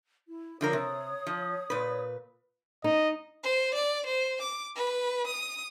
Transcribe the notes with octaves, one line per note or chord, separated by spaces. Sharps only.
E4
D3 F3 A#4 C#5 D#6
C3
F3
A#2 B4
D#4 D#5
C5
D5
C5
D6
B4
D#6